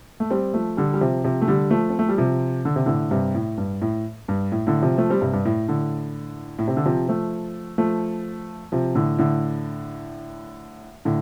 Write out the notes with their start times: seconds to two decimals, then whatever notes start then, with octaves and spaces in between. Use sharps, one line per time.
0.20 A3
0.30 G3 C4
0.54 F3 A3
0.77 D3 G3
0.94 G3
1.01 C3 F3
1.24 C3 F3
1.42 A3
1.48 D3 G3
1.71 F3 A3
1.89 C4
1.99 A3
2.09 G3
2.18 C3 F3
2.65 D3
2.76 C3
2.86 A2 D3
3.11 G2 C3
3.35 A2
3.58 G2
3.82 A2
4.28 G2
4.52 A2
4.67 A2 D3
4.83 C3 F3
4.98 F3 A3
5.10 G3 C4
5.21 G2 C3
5.33 G2
5.45 A2
5.68 A2 D3
6.59 A2
6.68 C3
6.77 D3
6.85 C3 F3
7.08 F3 A3
7.78 F3 A3
8.72 C3 F3
8.95 A2 D3
9.18 A2 D3
11.05 A2 D3